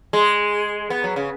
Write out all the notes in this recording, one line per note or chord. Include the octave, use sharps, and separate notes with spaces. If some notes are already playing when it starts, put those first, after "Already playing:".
G#3
B3
F#3
C#3